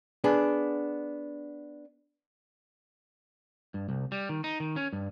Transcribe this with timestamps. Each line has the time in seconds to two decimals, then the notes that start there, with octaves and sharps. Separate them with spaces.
0.24 B3 D4 G#4
3.74 G2
3.89 C2
4.12 G3
4.29 D#3
4.44 D#4
4.60 D#3
4.76 C#4
4.93 G2